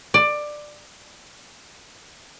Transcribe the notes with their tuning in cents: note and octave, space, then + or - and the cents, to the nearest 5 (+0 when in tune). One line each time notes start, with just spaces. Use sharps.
D5 +15